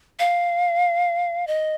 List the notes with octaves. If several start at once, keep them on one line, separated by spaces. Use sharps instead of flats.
F5
D#5